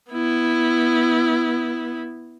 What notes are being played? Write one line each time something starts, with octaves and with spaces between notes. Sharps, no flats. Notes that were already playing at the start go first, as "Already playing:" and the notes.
B3 E4